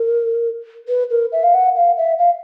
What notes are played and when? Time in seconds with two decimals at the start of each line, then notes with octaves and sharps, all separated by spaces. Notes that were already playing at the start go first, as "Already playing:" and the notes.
Already playing: A#4
0.88 B4
1.10 A#4
1.32 E5
1.43 F5
1.54 F#5
1.76 F5
1.97 E5
2.18 F5